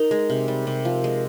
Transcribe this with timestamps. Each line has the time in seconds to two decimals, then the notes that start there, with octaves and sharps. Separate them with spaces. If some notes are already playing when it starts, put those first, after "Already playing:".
Already playing: D#4 A#4
0.11 G#3
0.30 C3
0.48 G3
0.67 C3
0.85 F3
1.04 G#3